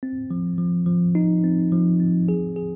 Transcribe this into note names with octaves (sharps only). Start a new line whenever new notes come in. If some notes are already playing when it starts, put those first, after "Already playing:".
C4
F3
F3
F3
D#4
C4
F3
C4
G#4
G#4